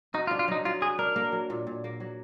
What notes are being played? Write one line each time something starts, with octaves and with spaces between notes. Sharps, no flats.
D#4 F#4
F4
D4
F4
F#3 D#4
F#3 F4
F#4 G#4
D4 A#4
A#3
F#3
A#2
A#2
A#3
F#3